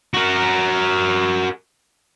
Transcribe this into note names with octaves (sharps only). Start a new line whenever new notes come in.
F#4 A#4